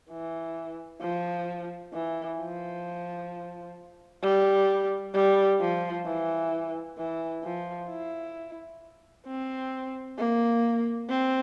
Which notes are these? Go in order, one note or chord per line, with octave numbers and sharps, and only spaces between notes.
E3
F3
E3
F3
G3
G3
F3
E3
E3
F3
E4
C4
A#3
C4